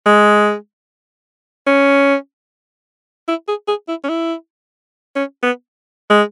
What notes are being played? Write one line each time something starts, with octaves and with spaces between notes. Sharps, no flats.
G#3
C#4
E4
G#4
G#4
E4
C#4
E4
C#4
B3
G#3